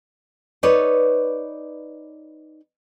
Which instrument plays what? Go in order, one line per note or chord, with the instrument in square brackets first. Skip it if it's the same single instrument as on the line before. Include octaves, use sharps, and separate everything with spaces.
[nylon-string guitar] D#4 B4 C#5 D5